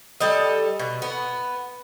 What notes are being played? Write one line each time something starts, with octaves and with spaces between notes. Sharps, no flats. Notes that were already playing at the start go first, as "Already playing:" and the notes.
G3 A4 D#5
B2
B3